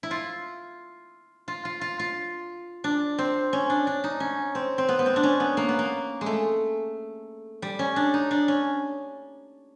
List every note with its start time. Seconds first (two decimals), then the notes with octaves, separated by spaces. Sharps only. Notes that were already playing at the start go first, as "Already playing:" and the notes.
0.03 E4
0.11 F4
1.48 F4
1.65 F4
1.81 F4
1.99 F4
2.84 D4
3.18 C4
3.53 C#4
3.70 D4
3.87 D4
4.04 D#4
4.20 C#4
4.55 C4
4.78 C4
4.89 B3
4.99 B3
5.06 C4
5.16 D4
5.23 C#4
5.40 B3
5.57 A#3
5.69 B3
5.79 A#3
6.21 G#3
6.26 A3
7.62 G3
7.79 C#4
7.96 D4
8.14 D#4
8.31 D4
8.48 C#4